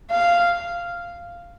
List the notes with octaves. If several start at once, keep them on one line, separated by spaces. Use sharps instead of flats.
F5